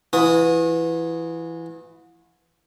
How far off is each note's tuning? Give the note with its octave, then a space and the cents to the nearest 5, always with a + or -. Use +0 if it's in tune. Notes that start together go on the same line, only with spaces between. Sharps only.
E3 +10 F#4 -40 D#6 +0